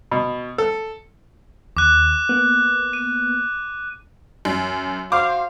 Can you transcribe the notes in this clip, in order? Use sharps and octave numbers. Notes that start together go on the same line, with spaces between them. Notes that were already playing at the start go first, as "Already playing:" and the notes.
B2
A4
D#2 D6 F#6
A#3 B3
D#7
F#2
F#4 C5 F5 D6